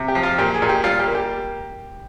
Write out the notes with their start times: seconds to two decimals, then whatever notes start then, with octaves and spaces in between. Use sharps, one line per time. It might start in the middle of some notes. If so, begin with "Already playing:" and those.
Already playing: C3
0.08 G4
0.15 F3
0.23 F4
0.38 A#2 G4
0.54 G#4
0.62 A#2
0.69 G4
0.84 G3 F4
0.99 G4
1.08 A#3
1.15 G4